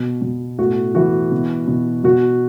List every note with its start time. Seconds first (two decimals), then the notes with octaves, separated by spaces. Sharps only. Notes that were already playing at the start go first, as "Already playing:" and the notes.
Already playing: B2
0.22 B2
0.59 A2 F#4
0.95 E3 F#4
1.32 B2
1.68 B2
2.04 B2 F#4